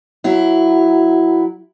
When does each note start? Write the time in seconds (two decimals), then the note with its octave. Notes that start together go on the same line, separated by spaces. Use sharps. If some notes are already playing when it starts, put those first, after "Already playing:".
0.24 F#3 E4